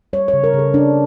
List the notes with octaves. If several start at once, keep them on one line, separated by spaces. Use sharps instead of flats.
G3 C#5
C#5
C#3
A#4
C#3
A4
A#3 D4